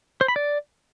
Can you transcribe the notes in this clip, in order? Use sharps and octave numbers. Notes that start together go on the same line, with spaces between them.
C5
B5
D5